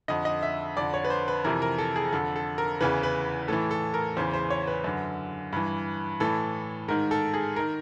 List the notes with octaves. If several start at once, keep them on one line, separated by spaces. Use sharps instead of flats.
F2 D3 D#5
D#5
E5
F2 D3 D5
C#5
B4
C5
B4
F2 C3 E3 A#4
A#4
A4
G#4
F2 D3 A4
A4
A#4
E2 C#3 E3 B4
B4
A2 E3 A4
A4
A#4
E2 C#3 E3 C5
C5
C#5
B4
F#2 D3
G2 E3
A2 E3 A4
G#2 D#3 A#4
A4
G#4
D#3 A#4